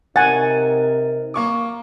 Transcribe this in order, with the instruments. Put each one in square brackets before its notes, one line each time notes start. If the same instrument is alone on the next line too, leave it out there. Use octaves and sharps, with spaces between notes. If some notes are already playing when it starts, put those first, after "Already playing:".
[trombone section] C3 D#4 A#4 [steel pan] F#5 G#5 [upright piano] A6
[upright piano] A#3 C#6 D6